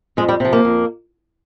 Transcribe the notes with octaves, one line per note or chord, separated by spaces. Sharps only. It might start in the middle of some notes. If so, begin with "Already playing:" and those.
F2 G#3
G3
C3 F3
A#3
F2